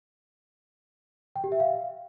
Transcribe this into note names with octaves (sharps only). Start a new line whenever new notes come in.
G5
G4
E5
F5